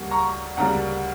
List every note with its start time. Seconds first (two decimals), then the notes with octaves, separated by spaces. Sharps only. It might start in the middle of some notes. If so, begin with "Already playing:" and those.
Already playing: D2 C#3 G3 A#3
0.11 A#5 C#6
0.57 D2 C#3 G3 A#3 F#5 A#5